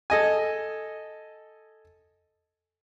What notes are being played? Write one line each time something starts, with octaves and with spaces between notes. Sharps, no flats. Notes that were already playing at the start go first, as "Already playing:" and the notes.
A4 D#5 G#5